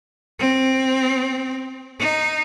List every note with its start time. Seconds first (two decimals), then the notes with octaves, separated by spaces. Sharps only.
0.40 C4
2.00 D#4